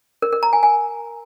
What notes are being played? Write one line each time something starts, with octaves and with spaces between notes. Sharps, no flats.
A#4
A#4
A#5
G#5
G#5